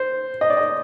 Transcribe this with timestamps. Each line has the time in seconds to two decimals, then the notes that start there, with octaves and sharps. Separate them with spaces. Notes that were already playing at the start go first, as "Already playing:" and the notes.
Already playing: C5
0.41 D#5
0.50 D5
0.57 D#5